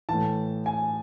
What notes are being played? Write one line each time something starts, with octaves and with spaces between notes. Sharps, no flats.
A2 E3 A5
G#5